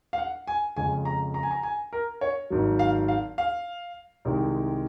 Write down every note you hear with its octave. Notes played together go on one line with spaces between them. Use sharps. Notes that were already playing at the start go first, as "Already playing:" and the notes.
F5
F#5
G#5
F2 C#3 G#3 G#5
A#5
A#5
G#5
A#5
G#5
A#4
C#5
G#1 G#2 F#3
F5
F5
F5
C2 C3 D#3 G#3